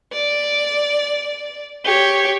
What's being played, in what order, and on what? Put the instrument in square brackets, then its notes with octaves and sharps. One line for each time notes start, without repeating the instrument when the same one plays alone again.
[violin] D5
G4 C#5